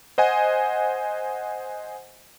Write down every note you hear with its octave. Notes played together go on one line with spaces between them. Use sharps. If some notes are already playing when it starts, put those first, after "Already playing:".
C5 D#5 F#5 G#5